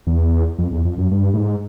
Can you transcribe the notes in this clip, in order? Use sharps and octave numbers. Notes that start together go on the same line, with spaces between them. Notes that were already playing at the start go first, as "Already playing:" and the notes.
E2
F2
E2
F2
F#2
G2
A2
G#2